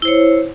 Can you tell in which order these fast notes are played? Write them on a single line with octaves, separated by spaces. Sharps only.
E4 C5 C#5